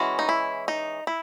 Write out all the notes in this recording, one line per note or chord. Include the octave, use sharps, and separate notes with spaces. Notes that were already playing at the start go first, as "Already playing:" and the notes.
Already playing: E3 G#3 C#4 F#4
D#4
E4
D#4
E4